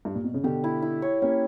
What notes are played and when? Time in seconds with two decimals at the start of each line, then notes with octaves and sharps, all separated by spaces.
0.05 G2
0.15 A#2
0.24 B2
0.34 C#3
0.44 B2 D3 G4
0.64 E4
0.82 E4
1.02 C#5
1.22 A#3 C#4 G4